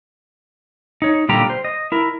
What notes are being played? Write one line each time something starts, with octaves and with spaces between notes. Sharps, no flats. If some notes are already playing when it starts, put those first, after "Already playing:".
D#4 C#5
A#2 D3 G3 F4 G4 A#5
C5
D#5
E4 A#4